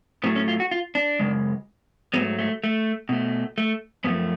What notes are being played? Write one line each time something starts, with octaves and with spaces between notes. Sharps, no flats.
A2 F#3 A3 B3
C#4
F4
F#4
F4
D4
F#2 C#3 G#3
G#2 F#3 A3 B3
A3
A3
B2 A3
A3
F#2 F3 A3 B3